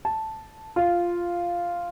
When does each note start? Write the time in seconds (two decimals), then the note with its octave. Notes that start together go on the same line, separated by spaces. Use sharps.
0.05 A5
0.76 F4